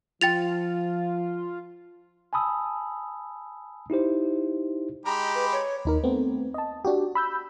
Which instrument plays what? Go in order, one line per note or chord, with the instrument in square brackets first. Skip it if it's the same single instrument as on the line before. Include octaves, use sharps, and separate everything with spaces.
[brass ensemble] F3 [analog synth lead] F4 [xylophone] G5 A6 F7
[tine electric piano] G#5 A5 B5 D#6 E6
D#4 E4 G4 C5
[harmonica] G#3 G4 B5 [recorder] A#5
[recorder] B4
C#5
[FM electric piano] D#2 D#4 A#4
A3 B3 C4
D#5 A5
D4 F#4 G4
B5 E6 G6